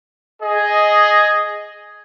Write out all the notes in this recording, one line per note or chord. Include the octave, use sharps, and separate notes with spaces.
G#4 D#5